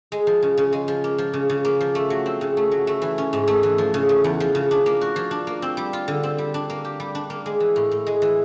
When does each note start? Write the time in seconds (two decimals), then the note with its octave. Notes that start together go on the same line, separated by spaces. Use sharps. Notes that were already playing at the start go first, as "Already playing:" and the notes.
0.12 G#3
0.27 F3
0.43 C#3
0.58 C#3
0.73 G#3
0.88 F3
1.04 A#3
1.18 F3
1.33 C#3
1.50 C#3
1.65 A#3
1.81 F3
1.95 A3
2.10 F#3
2.26 C4
2.41 C#3
2.57 A3
2.71 F#3
2.87 A3
3.02 E3
3.18 C#4
3.33 G#2
3.48 A3
3.63 E3
3.78 F3
3.94 C#3
4.09 A3
4.24 E2
4.40 F3
4.55 C#3
4.71 D4
4.86 A#3
5.01 F#4
5.16 F3
5.31 D4
5.47 A#3
5.62 C4
5.77 G3
5.93 F4
6.08 D3
6.23 C4
6.38 G3
6.54 D4
6.70 A#3
6.85 G4
7.00 G3
7.15 D4
7.30 A#3
7.46 G#3
7.60 E3
7.76 A2
7.91 A2
8.06 G#3
8.22 E3